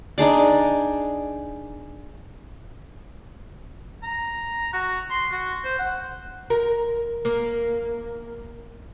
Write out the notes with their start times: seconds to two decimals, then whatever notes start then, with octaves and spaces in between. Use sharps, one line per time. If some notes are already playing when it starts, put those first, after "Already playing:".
0.18 D4 D#4 G#4 D5
4.03 A#5
4.73 F#4
5.10 C6
5.32 F#4
5.64 C5
5.79 F#5
6.50 A#4
7.25 A#3